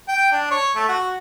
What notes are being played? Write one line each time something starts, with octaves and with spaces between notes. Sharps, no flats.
G5
D4
C#5
A3
F#4